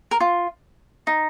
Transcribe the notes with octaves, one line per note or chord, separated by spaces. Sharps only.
A#4
F4
D#4